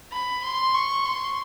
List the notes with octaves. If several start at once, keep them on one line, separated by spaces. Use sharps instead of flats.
B5
C6
C#6
C6